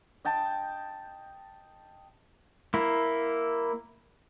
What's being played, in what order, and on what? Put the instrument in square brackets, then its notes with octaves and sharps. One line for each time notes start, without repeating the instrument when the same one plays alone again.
[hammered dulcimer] D#5 G5 A5
[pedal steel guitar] A#3 E4